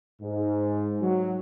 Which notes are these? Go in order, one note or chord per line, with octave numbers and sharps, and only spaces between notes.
G#2
F#3